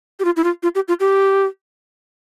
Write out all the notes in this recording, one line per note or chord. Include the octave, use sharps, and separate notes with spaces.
G4
F4
E4
F4
F4
G4
F4
G4